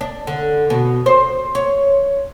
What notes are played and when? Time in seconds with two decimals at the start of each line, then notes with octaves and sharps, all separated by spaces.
0.01 D4
0.27 D3
0.70 B2
1.06 C5
1.55 C#5